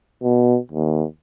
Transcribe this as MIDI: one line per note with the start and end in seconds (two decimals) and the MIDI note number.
0.23 0.58 47
0.72 1.04 39